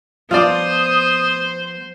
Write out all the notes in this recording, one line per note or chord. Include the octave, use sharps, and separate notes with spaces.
F3 B3 F4 C5 D5 A5 D#6